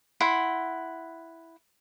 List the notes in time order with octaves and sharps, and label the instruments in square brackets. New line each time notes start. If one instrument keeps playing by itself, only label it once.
[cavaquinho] E4 F#5 C6